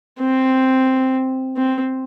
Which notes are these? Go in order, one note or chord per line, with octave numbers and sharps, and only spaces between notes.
C4
C4